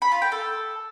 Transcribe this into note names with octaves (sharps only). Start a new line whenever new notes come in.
B5
F4
G5
A4